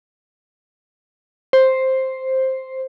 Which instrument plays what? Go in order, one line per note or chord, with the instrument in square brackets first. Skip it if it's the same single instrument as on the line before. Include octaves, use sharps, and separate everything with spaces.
[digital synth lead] C5